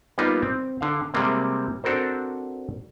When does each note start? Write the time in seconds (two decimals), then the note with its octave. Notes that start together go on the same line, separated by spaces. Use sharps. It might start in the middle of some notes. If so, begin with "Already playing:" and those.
0.18 G3 A#3 B3 D#4 F4
0.42 C4
0.81 D3 F5
1.14 C3 G3 G#3 A#3 C4
1.84 C4 D4 F#4 A4 A#4 C5